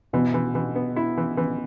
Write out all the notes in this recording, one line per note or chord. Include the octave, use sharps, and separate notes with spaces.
B2 E3
E3
E3
B3
E4
E3
E3